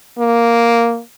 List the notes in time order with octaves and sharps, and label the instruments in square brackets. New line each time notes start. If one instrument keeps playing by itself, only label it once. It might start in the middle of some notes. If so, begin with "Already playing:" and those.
[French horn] A#3